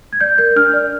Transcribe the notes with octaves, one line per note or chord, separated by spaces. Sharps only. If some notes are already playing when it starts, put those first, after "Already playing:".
G#6
D5 G6
A#4 G6
D4 F6
D5